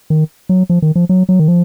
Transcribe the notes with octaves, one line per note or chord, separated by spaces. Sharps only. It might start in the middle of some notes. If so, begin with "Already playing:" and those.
D#3
F#3
F3
D#3
F3
F#3
F#3
D#3
F3